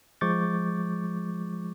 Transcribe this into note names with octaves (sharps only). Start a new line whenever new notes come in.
F3 G#3 C#6 D6 G6 A6